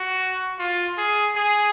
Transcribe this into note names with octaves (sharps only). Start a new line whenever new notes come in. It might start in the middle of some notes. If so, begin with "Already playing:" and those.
Already playing: F#4
F4
G#4
G#4